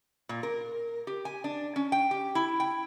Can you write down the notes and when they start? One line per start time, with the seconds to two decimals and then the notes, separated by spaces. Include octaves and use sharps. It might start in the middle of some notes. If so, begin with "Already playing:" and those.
0.29 A#2
0.43 A#4
1.07 G4
1.25 G#5
1.44 D4
1.76 C#4
1.92 G5
2.11 G4
2.35 E4
2.60 G5